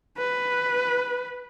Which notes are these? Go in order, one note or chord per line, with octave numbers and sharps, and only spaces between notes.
B4